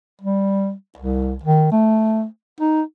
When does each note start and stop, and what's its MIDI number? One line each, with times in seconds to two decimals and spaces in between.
0.21 0.73 55
0.98 1.37 36
1.43 1.70 51
1.72 2.26 57
2.60 2.82 63